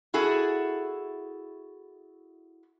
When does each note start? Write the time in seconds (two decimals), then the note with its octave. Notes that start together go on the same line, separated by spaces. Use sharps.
0.14 E4 F#4 G#4 A4